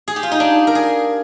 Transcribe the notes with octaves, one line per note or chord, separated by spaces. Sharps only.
G#4
G4
F4
D#4
D4
A#4
G#4